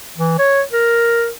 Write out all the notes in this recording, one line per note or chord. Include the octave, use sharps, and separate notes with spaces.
E3
C#5
A#4